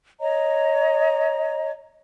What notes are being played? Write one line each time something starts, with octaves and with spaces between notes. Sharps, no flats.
C#5 D#5 A#5